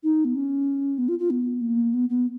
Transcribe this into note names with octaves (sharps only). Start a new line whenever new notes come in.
D#4
B3
C#4
B3
F4
F4
B3
A#3
B3
B3